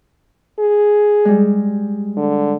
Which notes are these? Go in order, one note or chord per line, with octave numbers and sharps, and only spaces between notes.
G#4
G3 G#3
D3